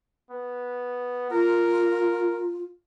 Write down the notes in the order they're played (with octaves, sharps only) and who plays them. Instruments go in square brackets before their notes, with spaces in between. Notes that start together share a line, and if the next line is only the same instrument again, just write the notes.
[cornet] B3
[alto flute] F4 [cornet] A#4